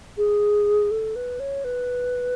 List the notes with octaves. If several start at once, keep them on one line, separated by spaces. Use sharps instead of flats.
G#4
A4
B4
C#5
B4